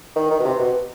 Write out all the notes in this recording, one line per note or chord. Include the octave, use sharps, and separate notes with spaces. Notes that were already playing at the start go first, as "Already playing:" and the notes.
D#3
D#3
B2
C3
B2